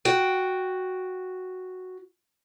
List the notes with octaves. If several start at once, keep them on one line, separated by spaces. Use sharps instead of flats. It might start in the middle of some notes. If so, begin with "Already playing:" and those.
F#4 G5